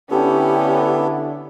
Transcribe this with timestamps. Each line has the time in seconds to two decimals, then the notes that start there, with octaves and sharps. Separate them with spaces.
0.11 D3 B3 C#4 D4 E4 G4 A4